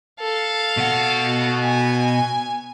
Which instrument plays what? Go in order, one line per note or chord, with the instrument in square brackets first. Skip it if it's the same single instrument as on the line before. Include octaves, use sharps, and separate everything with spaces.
[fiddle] A4 F5
[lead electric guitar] B2 F#5
[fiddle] G#5